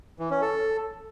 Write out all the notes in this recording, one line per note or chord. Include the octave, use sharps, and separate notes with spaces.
E3
C#4
A4